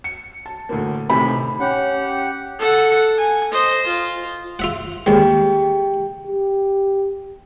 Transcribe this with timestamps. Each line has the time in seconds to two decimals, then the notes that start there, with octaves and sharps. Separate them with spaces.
0.04 C#7
0.46 A5
0.69 D2 A2 A#3
1.09 A2 C3 D#3 B5
1.60 C#4 G4 F#5
2.59 A4 F#5
3.18 G#5
3.51 C5 D#5
3.87 F4
4.59 F4 E5 F#5
5.06 D#2 G#3 G4 G5
6.27 G4